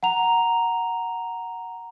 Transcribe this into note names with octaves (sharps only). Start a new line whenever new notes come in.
F#5 A#5 F7